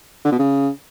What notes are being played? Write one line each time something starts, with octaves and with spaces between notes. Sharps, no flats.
D3
B2
C#3